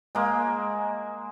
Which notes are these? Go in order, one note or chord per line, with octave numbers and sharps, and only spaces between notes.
G#3 A#3